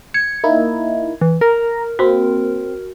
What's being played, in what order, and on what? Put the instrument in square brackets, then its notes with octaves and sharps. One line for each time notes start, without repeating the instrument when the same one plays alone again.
[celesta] G#6 [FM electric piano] C#7
[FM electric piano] A#3 D#4 E4
[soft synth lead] E3
[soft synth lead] A#4 [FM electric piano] A#5
[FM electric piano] A#3 C4 [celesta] F#4